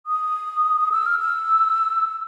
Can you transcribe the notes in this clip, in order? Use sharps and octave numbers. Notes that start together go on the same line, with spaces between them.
D#6
E6
F6
E6